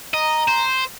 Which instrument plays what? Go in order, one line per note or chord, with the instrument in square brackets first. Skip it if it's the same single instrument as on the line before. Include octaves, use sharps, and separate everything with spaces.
[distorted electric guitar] D#5 [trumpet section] A#5
[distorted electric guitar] C5